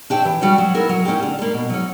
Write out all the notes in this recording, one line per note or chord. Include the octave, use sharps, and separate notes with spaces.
D4 G4 C#5 E5
E3
G3 C#4 F#4
F#3
B3 E4 A#4
F#3
A#3 C#4 G4
D3
G3 A#3
B2
F#3 C#4